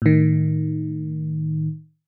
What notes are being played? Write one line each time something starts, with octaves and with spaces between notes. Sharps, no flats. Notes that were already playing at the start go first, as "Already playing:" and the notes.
A2 D#3